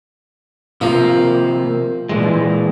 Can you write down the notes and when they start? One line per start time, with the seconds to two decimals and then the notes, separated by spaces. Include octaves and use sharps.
0.81 C3 F3 A#3
2.09 A#2 E3 G#3